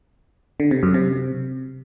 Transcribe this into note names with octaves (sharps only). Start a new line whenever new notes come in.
D3
C3
F#2
C3